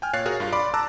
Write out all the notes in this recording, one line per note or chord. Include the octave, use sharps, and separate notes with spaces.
G5 G#5 F6
A#2 C#5 F5 F#6 A6 C7
F#4 G#4 A#4 C#5 F5
G2 F4 F5
D5 B5 C6 D6
A5 A#5 D6 E6 F#6 A6